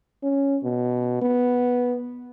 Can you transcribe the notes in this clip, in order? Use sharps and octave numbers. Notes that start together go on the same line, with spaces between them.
C#4
B2
B3